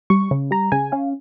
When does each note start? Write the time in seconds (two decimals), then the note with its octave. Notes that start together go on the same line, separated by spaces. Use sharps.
0.10 G3 C#6
0.31 C#3
0.51 G3 A#5
0.72 C#3 G#5
0.92 C#4 F5